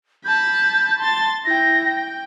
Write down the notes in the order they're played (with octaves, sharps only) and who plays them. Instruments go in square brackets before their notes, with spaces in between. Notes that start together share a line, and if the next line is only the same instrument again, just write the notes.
[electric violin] A5 B5 [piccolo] G6
[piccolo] A5 [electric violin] C6 A6
[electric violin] E4 G5 [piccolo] A#6
[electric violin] G5